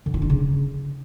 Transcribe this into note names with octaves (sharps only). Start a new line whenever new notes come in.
D3
E4
D4
C#3